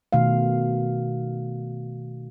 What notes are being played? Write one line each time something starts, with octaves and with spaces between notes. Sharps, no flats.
B2 D#3 A3 F5